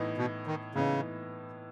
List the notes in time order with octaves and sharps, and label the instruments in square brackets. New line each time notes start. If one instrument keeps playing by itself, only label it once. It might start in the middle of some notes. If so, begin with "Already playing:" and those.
Already playing: [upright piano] A2 E3 B3 D#4
[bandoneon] B2
D#3
[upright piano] A2 E3 B3 D#4 [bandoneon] C#3